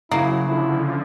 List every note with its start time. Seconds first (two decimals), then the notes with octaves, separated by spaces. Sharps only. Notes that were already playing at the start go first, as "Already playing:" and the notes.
0.11 C#3 F#3 A#3 E4
0.46 D3 F3 E4